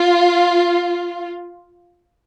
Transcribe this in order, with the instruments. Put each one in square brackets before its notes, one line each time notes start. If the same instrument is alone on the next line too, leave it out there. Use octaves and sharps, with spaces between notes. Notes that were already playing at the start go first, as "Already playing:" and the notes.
Already playing: [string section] F4